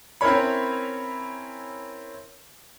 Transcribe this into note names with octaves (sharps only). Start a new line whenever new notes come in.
C4 C#4 E4 A#4 C#5 B5